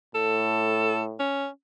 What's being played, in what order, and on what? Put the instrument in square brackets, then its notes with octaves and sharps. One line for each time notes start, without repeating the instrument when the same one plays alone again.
[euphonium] A2 [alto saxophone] A4
[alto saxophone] C#4